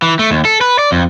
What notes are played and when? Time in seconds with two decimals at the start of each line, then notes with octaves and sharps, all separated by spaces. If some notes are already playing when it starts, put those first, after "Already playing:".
0.02 E3
0.19 A3
0.31 D#2
0.45 A4
0.61 B4
0.79 D5
0.92 F2